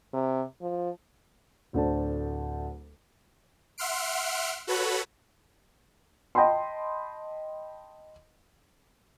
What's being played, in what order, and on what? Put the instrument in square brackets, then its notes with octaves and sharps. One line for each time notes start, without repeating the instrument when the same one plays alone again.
[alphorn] C3
F3
[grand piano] D1 D2 A3 D4 C5 A5
[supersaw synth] E5 F#5 C6 F6 C7 D7
F#4 A4 B4 C#5 F#5 B5
[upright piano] D#5 G5 A5 B5 C6